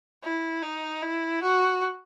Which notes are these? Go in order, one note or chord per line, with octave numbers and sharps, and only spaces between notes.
E4
D#4
E4
F#4